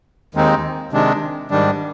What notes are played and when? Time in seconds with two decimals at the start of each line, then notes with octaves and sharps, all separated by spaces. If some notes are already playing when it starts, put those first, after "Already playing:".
0.35 D#2 D#3 G#3 C4 D#4
0.92 C3 D#3 G#3 D4
1.50 G#2 D#3 G3 D4